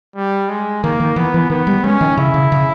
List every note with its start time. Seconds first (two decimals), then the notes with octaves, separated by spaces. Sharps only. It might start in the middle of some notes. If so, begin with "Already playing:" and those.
0.16 G3
0.49 G#3
0.84 D#3 A#3
1.00 D#3
1.16 E3 B3
1.34 E3
1.50 D#3 B3
1.67 G3
1.84 G#3 C#4
2.01 D#3
2.17 C#3 E4
2.34 C#3
2.52 C#3